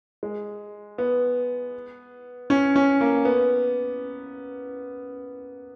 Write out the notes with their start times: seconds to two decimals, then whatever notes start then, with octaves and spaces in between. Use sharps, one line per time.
0.23 G#3
0.98 B3
2.50 C#4
2.76 C#4
3.01 A#3
3.25 B3